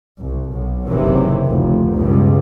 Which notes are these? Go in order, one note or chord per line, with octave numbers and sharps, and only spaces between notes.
C2
B1
F#1 C3 D#3 E3 F#3
F1 D2
C#2 G2 B2